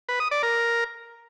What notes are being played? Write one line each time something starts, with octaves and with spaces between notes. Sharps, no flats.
B4
D#6
D5
A#4